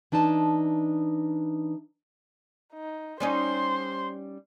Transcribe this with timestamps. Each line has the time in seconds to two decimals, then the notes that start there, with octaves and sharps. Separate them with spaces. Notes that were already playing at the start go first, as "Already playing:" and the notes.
0.12 E3 D4 D#4 D5 A5
2.74 D#4
3.20 G3 C#4 D#4 C5 C6